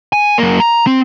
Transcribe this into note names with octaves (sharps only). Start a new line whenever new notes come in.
G#5
F#2 A#3
A#5
C4